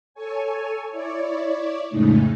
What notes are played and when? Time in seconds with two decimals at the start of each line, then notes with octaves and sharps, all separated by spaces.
0.14 A4 C#5 G#5
0.91 E4 C#5 D5
1.90 F2 A2 C#3 G#3 A3 D#4